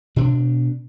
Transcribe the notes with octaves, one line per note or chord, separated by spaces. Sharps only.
B2 D4